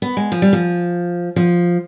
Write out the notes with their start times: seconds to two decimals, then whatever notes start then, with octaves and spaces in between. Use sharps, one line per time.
0.02 B3
0.17 G#3
0.32 F3
0.42 G3
0.53 F3
1.36 F3